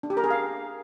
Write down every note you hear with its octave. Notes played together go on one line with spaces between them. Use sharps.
D4
G4
A#4
G#4
F5